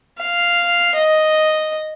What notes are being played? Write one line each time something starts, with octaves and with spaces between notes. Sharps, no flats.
F5
D#5